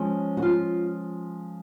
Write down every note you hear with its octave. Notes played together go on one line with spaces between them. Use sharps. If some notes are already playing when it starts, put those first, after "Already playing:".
Already playing: F3 G#3 C#4
F#4
F4